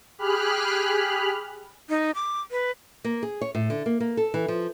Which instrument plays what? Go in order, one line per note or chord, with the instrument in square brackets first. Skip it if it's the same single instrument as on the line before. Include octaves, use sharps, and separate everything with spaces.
[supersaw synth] G4 G#4 B5 F6 F#6
[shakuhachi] D#4
D6
B4
[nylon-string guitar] A#3
G#4
C#5
A2
D3
A#3
A#3
A4
E3
F3